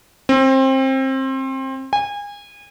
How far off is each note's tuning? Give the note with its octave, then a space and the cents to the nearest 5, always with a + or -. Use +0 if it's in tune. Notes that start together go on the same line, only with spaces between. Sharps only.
C4 +25
G#5 -30